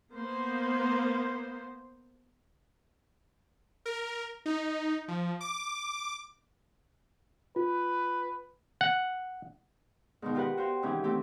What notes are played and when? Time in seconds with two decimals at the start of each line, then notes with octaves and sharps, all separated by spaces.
0.14 A#3 B3 C5
3.86 A#4
4.46 D#4
5.08 F3
5.41 D6
7.56 F4 B4
8.81 F#5
10.22 G#2 B2 D#3
10.35 F4 G4 A#4 B4 F#5
10.57 F#4 C5 F5 G5
10.82 G#2 C3 D#3 E3 C#4 G4
11.04 A3 C4 G4